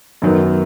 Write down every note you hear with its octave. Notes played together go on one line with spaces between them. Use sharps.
F#2 D#3 F#3 B3